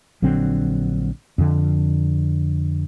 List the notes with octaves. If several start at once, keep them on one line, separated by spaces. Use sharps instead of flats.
A#1 D3 F#3 C4
F2 D3